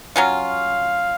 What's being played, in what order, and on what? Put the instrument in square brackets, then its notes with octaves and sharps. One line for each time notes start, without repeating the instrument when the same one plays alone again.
[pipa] F#3 C#4 F4 [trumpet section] F5